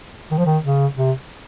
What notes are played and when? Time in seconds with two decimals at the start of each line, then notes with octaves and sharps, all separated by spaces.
0.31 D#3
0.38 F3
0.46 D#3
0.64 C#3
0.96 C3